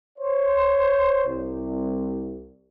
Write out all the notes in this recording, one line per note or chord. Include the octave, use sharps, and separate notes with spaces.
C5 C#5
C2